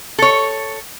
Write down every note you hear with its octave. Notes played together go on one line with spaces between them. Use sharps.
A4 C#5